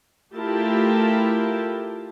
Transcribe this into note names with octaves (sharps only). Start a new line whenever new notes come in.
A3 E4 F4 G4 A#4 A5